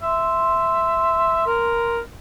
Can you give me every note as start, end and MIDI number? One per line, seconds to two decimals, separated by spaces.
0.02 1.44 76
0.02 1.92 84
1.47 2.00 70